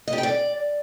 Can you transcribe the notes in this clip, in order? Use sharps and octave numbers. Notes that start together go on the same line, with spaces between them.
D#5
G4
G5
D5